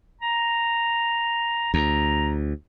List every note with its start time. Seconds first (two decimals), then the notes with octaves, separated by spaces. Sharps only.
0.21 A#5
1.74 D2 A#5